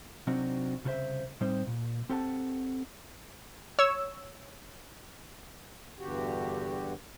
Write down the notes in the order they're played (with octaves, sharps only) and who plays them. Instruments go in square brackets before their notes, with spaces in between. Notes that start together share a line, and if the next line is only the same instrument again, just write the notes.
[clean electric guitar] C3 F#3 C4 D4 D#4 F#4
C2 C#3 F#4 A4 C5 E5
A2 G3 C4 D#4 C5
A#2
C4 G4 A4 F#5 G5 A5
[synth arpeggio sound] C#5 E6
[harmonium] E2 G2 D3 F#4 G4